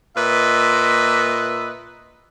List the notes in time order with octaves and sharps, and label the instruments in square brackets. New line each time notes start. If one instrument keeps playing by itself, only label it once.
[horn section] A#2 B4 D#5 E5